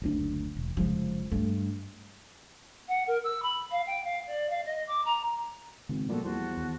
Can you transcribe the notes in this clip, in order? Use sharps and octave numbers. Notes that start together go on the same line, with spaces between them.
F#1 D2 D4
E1
F1 C#3 F3 G#3
G2 A3
F#5
A#4
E6
B5
F5
G5
F5
D5
F5
D#5
D6
A#5
G#1 C#3
A#2 F3 G3 B3 F#4 A4
E2 F#4 C5 A5
D#2